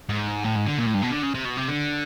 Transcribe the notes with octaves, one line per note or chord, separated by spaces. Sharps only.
G#2
A2
G#2
D3
A#2
A2
G2
B2
D3
C#3
C3
B2
C3
D3